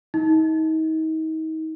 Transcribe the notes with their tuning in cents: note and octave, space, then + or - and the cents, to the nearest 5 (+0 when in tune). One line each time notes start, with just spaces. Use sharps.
D#4 +35